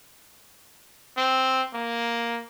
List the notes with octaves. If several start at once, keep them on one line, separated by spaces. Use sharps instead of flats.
C4
A#3